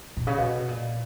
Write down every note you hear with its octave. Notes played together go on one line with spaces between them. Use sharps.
B2
C#3
B2
A#2